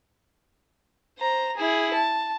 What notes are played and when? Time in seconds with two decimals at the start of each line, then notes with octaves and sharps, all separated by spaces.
1.18 C5 A#5
1.57 E4 G#4
1.94 A5